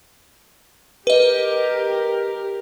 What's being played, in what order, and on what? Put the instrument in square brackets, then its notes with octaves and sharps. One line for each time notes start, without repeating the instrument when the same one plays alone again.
[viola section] G4 A#4 [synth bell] B4 D#5